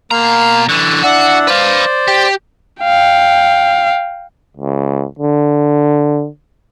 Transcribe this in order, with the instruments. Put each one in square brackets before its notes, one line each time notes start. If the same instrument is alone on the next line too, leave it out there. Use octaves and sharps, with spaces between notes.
[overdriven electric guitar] B2 A#5 [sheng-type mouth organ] A#3 F5 C6
[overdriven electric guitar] D3 E3 [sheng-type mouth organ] C#6
[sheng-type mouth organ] D4 E4 F#5 [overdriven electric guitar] F#4
[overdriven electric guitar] B4 F5 [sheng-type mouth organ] C5 D5
[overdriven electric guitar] G4
[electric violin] F5 G5
[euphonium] C#2
D3